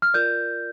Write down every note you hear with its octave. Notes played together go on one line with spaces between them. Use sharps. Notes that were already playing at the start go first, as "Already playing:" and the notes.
F6
F4 A#4 D5 G6